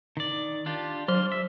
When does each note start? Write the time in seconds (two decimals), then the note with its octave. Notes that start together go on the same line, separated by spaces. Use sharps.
0.17 D#3 D5
0.66 D4 F4 G4
1.08 F#3 G3 C6 F6
1.32 E5